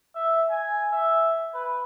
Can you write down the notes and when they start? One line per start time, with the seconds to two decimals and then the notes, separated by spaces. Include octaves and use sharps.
0.15 E5
0.50 G#5
0.92 E5
1.54 B4